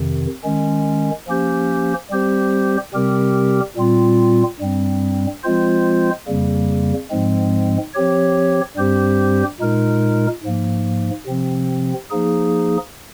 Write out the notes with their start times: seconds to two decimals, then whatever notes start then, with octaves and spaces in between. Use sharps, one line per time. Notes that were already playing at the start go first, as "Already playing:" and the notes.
Already playing: F2 C3 D#3
0.44 D#3 G#3 C#4
1.27 F3 A#3 C#4 G4 C5
2.10 G3 C4 G4 C5
2.94 C3 G3 C4 G4 A#4
3.77 A#2 G3 C4 F4
4.60 G2 G3 C4
5.44 F3 G#3 C4 F4 C5
6.27 F2 C#3 G3 A#3
7.11 G#2 F3 G#3 C4
7.94 F3 C4 G4 C#5
8.77 G2 G3 C4 G4 C5
9.60 A#2 G#3 D#4 A#4
10.44 G#2 F3 A#3
11.27 C3 F3 C4
12.11 F3 A#3 D#4 G#4